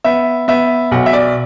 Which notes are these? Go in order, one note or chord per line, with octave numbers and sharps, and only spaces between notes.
B3 E5
B3 E5
B1 F#5
E5
D5